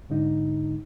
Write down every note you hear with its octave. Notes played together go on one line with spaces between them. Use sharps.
G#2 D3 D#4